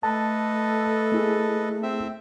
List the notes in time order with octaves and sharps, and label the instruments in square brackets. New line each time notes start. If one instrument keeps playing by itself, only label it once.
[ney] A3 [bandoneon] A4 B4 D#5 [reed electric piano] A5
[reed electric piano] A#3 E4 G#4
[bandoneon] C4 E5